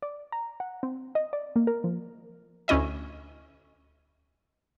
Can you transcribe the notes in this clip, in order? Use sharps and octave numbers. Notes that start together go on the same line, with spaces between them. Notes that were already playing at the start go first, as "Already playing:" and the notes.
D5
A#5
F#5
C4
D#5
D5
A#3
A#4
F3
D2 C#4 E4 D#5 E5